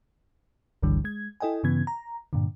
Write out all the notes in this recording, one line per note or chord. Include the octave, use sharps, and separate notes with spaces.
G1 C#2 G2 D3 E3 G3
G#3 G#6
E4 A4 D#5 G5 G#5
G2 C#3 E3 B3 G#6
A#5
G2 A#2 D3